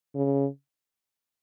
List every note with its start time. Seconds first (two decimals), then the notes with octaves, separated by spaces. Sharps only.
0.15 C#3